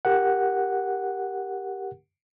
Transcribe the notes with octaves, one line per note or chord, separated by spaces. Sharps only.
G4 A#4 F#5